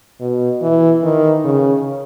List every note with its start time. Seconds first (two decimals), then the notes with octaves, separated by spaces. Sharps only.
0.20 B2
0.62 E3
1.03 D#3
1.45 C#3